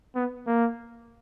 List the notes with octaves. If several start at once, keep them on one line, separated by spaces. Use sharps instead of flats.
B3
A#3